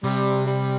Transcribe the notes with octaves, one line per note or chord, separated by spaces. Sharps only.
C3 G3
G3